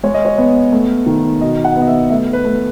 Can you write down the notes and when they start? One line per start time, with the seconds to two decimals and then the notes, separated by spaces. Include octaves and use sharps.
0.03 G#3 C#5
0.14 D#5
0.25 C#5
0.38 B3
0.72 A3
1.06 D#3
1.41 B2 D#5
1.64 F#5
1.76 B3
1.82 D#5
1.87 E5
2.10 A3 E5
2.33 B4
2.45 A3